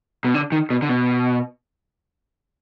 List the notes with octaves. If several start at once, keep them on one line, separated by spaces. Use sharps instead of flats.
B2
D3
D#3
B2
D3
B2